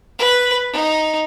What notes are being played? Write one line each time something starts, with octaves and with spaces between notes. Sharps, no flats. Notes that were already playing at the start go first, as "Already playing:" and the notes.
B4
D#4